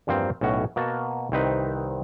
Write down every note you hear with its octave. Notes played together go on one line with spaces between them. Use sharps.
E2 G2 F3 A#3 C4
B1 A2 C#4 F#4 G#4
B2 A#3 F#4 A5
C2 D#3 C4 D#4 B4